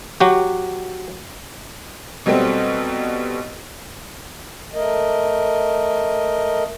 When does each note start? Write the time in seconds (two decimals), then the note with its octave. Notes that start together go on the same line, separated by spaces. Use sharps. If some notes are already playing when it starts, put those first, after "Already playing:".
0.20 F#3 F#4 G4
2.26 B2 F#3 G3 A3 C4
4.73 A3 A#4 D#5